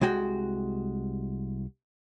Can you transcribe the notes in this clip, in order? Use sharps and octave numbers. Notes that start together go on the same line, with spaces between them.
C2 G#3 F#4 G5